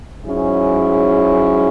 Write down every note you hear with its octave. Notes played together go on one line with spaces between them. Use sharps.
G#2 F#3 C#4 E4 G#4